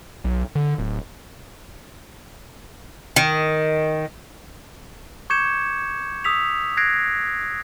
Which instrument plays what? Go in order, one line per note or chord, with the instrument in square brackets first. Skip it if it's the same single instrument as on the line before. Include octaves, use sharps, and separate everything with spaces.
[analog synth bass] B1
D3
D1
[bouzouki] D#3
[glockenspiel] C#6 D6 G6 G#6 C#7 E7
D#6 E6 B6 F7
F#6 G#6 A#6 C7 D7